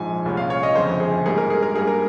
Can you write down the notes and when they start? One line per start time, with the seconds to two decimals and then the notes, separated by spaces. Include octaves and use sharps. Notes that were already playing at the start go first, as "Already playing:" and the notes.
Already playing: A#1 G#2 F3 G#5
0.26 C2 A#2 G#3 C#4
0.37 F5
0.50 C#5
0.63 D#5
0.75 G1 F2 C#3 C5
1.00 G#4
1.26 G#2 G3 A#3 G#4
1.38 A#4
1.50 G#4
1.63 A#4
1.75 G2 G3 A#3 G#4
1.87 A#4